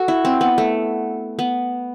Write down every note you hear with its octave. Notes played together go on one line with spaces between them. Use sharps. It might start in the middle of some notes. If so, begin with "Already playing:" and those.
Already playing: F#4 A4
E4
C4
B3
A3
B3